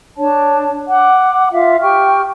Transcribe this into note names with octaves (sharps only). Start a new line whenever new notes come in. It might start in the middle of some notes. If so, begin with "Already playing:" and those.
D4 C#5 A5
F#5 D6
F4 E5 F5
G4 G5 C#6 F6